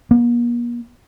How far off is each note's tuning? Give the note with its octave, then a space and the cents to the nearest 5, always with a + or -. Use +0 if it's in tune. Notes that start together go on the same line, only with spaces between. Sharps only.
A#3 +45